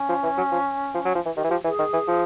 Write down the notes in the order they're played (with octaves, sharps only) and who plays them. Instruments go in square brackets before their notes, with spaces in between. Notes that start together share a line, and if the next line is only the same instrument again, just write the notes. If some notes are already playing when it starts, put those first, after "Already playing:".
Already playing: [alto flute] C#4
[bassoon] F3
E3
F#3
F3
F3
F#3
F3
E3
[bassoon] D#3 [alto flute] G4
[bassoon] E3
[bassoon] F3 [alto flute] G4
[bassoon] E3
[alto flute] G#4
[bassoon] D#3
E3
F3